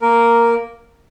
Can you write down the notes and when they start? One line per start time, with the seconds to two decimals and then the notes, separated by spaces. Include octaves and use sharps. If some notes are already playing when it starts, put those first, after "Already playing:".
0.02 A#3 A#4